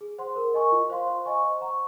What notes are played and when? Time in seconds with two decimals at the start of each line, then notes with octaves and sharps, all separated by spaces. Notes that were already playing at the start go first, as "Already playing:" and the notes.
0.01 G#4
0.18 C5 F#5 C6
0.36 A#4
0.54 D#5 G#5 C#6
0.72 F4
0.90 C5 F5 C6
1.08 C5
1.25 D#5 G#5 C#6
1.43 C5
1.61 F#5 A#5 C#6